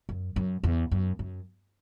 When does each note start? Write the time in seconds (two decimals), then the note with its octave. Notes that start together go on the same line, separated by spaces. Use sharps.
0.09 F#2
0.36 F#2
0.64 E2
0.91 F#2
1.19 F#2